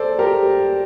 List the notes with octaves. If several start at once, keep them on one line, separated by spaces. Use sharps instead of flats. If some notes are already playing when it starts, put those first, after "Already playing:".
Already playing: A4 C5 D5
G4 A#4